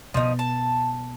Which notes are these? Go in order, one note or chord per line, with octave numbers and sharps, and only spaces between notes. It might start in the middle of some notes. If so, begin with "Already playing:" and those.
B2 F3 B3 D#4
A5